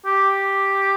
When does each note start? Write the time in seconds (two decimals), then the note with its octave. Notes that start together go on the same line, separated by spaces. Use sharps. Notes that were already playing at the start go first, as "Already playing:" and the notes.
0.06 G4